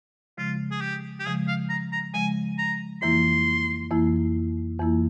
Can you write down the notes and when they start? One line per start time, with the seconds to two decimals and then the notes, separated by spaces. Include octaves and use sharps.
0.38 C#3 F3 G#3 F4
0.71 G#4
0.81 G4
1.20 G4
1.26 C#3 F3 G#3 G#4
1.48 F5
1.70 A#5
1.92 A#5
2.14 C#3 F3 G#3 G#5
2.59 A#5
3.02 F2 E3 A#3 E4 C6
3.91 F2 E3 A#3 E4
4.79 F2 E3 A#3 E4